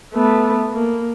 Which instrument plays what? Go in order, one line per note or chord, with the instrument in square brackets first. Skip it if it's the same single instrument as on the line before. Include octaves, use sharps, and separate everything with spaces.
[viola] A3 B3
A#3